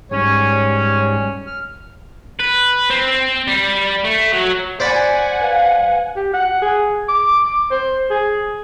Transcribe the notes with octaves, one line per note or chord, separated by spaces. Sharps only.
G#2 G3 C#4 C#5
F6
B4
C4
G3
A3
F#3
C5 D5 F#5 G#5 B5
B4 F5
G4
F#5
G#4
D6
C5
G#4